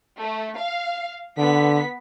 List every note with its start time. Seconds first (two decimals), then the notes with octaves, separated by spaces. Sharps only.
0.19 A3
0.58 F5
1.38 D3 B3 B6